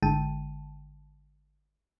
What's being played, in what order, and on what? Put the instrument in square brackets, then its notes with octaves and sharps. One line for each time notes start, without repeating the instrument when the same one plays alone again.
[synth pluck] G#1 D3 G#3 G5 A5 D#7